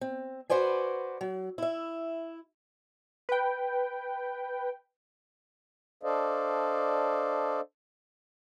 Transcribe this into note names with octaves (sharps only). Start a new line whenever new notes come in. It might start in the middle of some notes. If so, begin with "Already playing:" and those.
C4
F#4 B4 C5 D5 G#5
F#3
E4 E5
B4 G5
D4 A4 C5 D5 D#5 F5